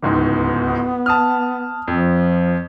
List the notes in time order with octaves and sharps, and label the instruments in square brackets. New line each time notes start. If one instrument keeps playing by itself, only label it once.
[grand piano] D1 C#2 G#2 [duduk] B3
[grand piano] A5 D#6 F6
[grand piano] F2 [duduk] F3